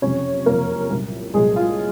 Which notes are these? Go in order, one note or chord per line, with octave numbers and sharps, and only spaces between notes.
F#1 F2 C3 C#4 C#5
F#1 F2 C3 A#3 A#4
C2 A#2 F#3
C2 A#2 F#3 G#3 G#4
F4